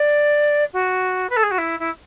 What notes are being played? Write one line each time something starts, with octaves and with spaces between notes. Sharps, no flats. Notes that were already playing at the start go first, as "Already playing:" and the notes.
Already playing: D5
F#4
B4
A4
G#4
F#4
E4
E4